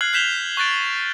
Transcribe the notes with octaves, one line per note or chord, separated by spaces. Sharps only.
F6 F#6 G#6 C7 F#7
F#6 G6 B6 E7 F7 G7
C#6 F#6 A6 D7